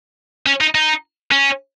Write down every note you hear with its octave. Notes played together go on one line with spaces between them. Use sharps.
C#4
D#4
D#4
C#4